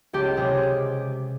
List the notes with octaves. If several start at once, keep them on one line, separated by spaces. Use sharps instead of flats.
C#2 G4
C3 G#4